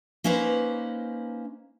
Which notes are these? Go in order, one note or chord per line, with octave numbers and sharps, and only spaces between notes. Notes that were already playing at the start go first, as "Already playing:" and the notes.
A#3 C#4 D#4 B4 C5